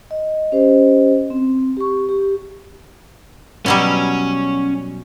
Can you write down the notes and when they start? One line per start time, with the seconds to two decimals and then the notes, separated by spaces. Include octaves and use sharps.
0.11 D#5
0.52 C#4 G4 C5 D#5
1.30 C4
1.77 G4 C#6
2.09 G4
3.66 B2 F#3 G3 C#4